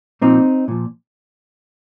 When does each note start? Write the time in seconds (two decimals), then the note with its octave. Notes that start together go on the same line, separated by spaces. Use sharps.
0.21 A#2 F3 C4 D#4
0.68 A#2 F3